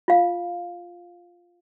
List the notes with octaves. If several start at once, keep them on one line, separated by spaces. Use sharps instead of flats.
F4 F5